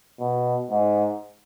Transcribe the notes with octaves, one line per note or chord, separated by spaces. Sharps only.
B2
G#2